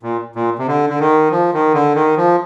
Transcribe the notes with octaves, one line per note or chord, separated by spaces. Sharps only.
A#2
A#2
C3
D3
D3
D#3
F3
D#3
D3
D#3
F3